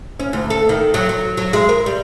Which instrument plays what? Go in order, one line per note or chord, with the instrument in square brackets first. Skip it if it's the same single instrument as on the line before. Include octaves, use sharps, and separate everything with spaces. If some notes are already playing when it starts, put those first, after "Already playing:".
[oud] C#4
D2
A4
D#3
F#3
F#3
F#3
G#3
A#4
G3